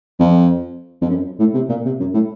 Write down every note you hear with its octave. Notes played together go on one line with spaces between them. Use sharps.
F2
F2
F#2
A2
C3
A#2
C3
F#2
A2